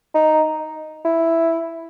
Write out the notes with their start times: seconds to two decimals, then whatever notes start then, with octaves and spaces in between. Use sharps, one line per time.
0.14 D#4
1.05 E4